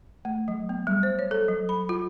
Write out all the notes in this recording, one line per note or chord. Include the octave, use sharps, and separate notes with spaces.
A3
F#3
B3
G3
C5
C#5
A4
F#3
B5
F4